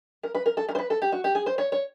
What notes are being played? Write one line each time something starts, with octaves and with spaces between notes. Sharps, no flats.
A#4
B4
A#4
A4
A#4
C5
B4
A4
G4
F#4
G4
G#4
C5
C#5
C#5